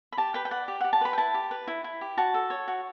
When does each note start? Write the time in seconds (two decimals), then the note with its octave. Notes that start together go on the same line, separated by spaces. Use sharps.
0.12 B5
0.17 G4 A5
0.34 B4 G5
0.45 G5
0.51 D5 F#5
0.68 G4
0.81 F#5
0.84 G4
0.93 A5
1.01 B4 B5
1.13 G5
1.18 E4 A5
1.34 G4
1.51 B4
1.68 E4
1.84 E4
2.01 G4
2.17 F#4 A5
2.34 A4
2.50 C#5
2.68 F#4